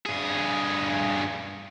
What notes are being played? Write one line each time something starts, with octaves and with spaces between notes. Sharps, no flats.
G2 G#4